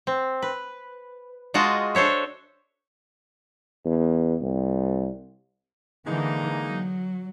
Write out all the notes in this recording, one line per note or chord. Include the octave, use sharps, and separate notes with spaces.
C4
B4
G#3 F4 F#4 D#5 A5
D4 A4 C5 C#5 E5
E2
C2
D3 E3 G#3 A#3 D#4
F#3